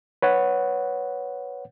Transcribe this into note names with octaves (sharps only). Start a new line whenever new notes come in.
B4 C#5 F#5